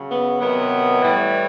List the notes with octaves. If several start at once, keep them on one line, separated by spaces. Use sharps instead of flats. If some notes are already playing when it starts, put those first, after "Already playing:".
Already playing: C#3 F#3
B3
C3 D#3 F#3 B3
A2 E3 G3